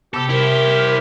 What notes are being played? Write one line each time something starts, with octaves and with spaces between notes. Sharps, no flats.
C3 B3 G4 A4
E4 A#4 C5